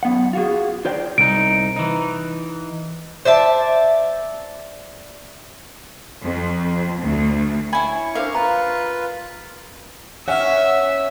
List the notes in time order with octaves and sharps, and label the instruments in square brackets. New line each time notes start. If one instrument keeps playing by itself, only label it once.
[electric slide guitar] F#2 B3 F#5
F4 F#4 G#4
F4 C5 D5 G5
[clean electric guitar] C2 D#4 [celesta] D7
[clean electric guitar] E3 D#4
[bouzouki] C5 D5 E5 A5
[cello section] F2
D2
[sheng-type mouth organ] C#4 C#6 [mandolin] E4 G#5 [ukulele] B5
[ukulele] D4 C5 E5 [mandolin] A#4 F5
[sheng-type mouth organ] F4 B4 [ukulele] A#5
[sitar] C#4 [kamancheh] E5 [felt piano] F#5 F6